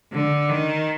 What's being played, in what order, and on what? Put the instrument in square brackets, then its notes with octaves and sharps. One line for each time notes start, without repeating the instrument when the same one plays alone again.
[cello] D3
D#3